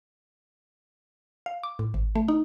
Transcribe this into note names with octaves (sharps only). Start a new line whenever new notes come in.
F5
D6
A2
G#1
A3
D#4